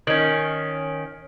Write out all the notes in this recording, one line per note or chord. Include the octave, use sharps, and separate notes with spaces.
D#3 C#4